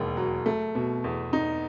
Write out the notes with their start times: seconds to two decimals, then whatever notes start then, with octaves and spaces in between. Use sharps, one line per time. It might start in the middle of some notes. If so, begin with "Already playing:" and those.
Already playing: E1 D#2
0.17 F#3
0.46 A3
0.75 B2
1.04 E2
1.33 D#4